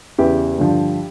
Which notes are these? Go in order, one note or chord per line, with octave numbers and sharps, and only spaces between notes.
E2 C#3 E3 E4 G4
G2 D3 F3